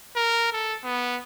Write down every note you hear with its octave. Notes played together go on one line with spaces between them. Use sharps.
A#4
A4
B3